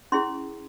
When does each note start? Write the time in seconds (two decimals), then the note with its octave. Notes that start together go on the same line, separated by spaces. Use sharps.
0.12 C#4 E4 G#4 C6